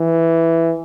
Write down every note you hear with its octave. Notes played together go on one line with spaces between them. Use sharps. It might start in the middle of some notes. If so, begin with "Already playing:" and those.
Already playing: E3